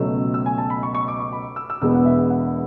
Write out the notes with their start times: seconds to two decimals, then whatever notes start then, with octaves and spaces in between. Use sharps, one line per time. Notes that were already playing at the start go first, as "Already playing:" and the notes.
Already playing: C#2 B2 F#3 A3 E6
0.34 E6
0.46 G#5
0.58 A5
0.70 B5
0.83 C#6
0.95 C#6
1.08 D6
1.19 C#6
1.32 B5
1.56 E6
1.70 E6
1.81 E1 E2 B2 G#3 B3 E6
1.94 F#5
2.06 E5
2.19 E5
2.30 F#5